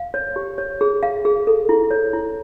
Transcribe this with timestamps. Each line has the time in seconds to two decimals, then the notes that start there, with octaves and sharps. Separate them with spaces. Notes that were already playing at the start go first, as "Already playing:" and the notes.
Already playing: F5
0.14 C#5
0.36 G4
0.58 C#5
0.81 G#4
1.03 F5
1.25 G#4
1.47 A4
1.69 E4
1.91 C#5
2.13 E4